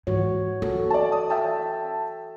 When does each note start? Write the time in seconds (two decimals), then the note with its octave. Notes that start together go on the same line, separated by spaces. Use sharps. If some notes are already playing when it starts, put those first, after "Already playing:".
0.07 G#2 E3 F#4 C#5
0.62 C#4 F#4 A4
0.90 D5 A5
1.12 D#6
1.30 E5 G5 A5